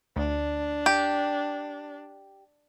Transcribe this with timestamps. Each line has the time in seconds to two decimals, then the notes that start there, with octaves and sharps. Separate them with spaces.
0.16 D2 D4
0.86 G4